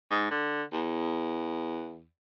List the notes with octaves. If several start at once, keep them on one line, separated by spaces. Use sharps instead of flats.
G#2
D3
E2